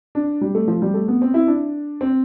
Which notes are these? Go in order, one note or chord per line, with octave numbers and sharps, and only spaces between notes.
D4
G3
A3
F3
G3
A3
B3
C4
E4
D4
C4